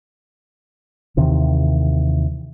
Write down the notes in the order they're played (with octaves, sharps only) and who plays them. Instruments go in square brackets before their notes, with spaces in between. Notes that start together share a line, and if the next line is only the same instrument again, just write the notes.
[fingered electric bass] D#2 C3 D#3 E3